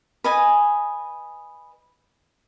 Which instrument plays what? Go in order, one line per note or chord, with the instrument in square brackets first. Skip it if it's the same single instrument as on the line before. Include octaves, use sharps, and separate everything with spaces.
[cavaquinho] B4 D#5 G#5